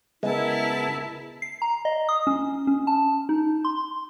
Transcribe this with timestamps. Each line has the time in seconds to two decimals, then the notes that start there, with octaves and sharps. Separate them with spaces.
0.23 C#3 G#3 B3 E4 A#4 A5
1.42 C7
1.62 A#5
1.85 D#5
2.09 D#6
2.27 C#4
2.67 C#4
2.87 A5
3.29 D#4
3.65 C6